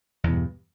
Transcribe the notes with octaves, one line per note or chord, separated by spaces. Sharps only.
E2 G2 B2